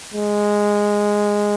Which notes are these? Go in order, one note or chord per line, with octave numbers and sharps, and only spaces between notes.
G#3